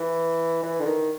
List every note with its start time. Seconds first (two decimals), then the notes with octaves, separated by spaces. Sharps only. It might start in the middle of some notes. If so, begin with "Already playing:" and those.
Already playing: E3
0.63 E3
0.81 D3
0.86 D#3